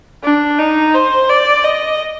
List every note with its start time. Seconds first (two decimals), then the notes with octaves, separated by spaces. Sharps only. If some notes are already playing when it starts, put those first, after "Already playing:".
0.23 D4
0.58 D#4
0.94 C5
1.29 D5
1.64 D#5